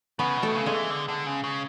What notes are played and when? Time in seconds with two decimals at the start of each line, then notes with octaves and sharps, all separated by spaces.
0.19 C#3 B3 B4
0.37 B2
0.42 A3 A4
0.55 C#3
0.66 G#3 G#4
0.73 E3
0.90 D3
1.08 D3
1.26 C#3
1.44 C#3